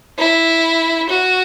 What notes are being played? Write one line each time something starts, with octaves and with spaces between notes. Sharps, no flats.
E4
F#4